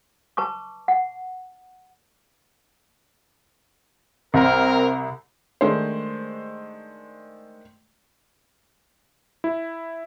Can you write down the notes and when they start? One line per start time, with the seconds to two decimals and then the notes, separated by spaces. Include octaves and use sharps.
0.37 B4 A5 C#6 D6
0.88 F#5
4.34 C2 C4 A#4
5.61 D#3 G#3 A3 D4 C5
9.44 E4